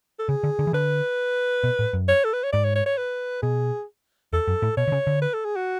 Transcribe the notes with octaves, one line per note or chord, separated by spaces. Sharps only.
A4
C#3 G#4
D3
D3
E3
D3 B4
B2
A2
F#2
C#5
A4
B4
C#5
G#2 D5
C#5
C#5
C#5
B4
B2 G#4
E2 A4
F#2
A2
B2 C#5
D3
C#3
D3
B4
A4
G#4
F#4